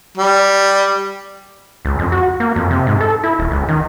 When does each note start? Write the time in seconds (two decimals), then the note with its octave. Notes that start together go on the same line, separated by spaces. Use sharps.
0.17 G3
1.85 C#2
1.99 F2
2.12 F#4
2.40 A#3
2.56 F2
2.70 C3
2.87 G#2
3.01 A4
3.23 E4
3.39 D#1
3.51 C#2
3.69 D#3